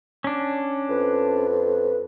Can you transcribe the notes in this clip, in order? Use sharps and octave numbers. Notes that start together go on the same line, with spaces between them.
C#4 D4
F2 B4